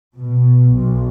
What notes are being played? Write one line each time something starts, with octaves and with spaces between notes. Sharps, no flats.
B2
B1